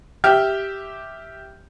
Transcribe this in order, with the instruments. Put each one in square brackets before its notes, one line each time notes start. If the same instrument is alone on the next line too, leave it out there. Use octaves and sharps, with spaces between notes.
[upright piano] G4 E5 G5 F6 G6